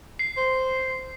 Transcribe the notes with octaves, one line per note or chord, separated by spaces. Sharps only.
C7
C5